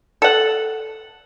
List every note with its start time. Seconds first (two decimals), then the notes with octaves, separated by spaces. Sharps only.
0.22 A4 F#5